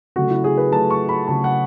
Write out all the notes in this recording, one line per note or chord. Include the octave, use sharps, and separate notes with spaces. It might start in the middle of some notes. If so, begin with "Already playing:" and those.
C#3 F#3 A3 F#4
E4
G#4
B4
C#3 F#3 A3 A5
C#6
B5
C#3 F#3 A3 A5
F#5